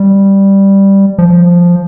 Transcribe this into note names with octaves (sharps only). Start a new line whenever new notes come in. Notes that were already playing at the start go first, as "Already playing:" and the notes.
Already playing: G3
F3